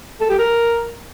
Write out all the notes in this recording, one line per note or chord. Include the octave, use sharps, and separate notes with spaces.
A4
G4
A#4